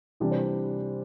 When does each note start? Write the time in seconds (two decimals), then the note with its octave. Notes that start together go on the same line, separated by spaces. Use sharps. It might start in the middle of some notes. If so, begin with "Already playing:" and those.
0.20 C3 E3 G3 D4 D5
0.31 C5
0.38 D5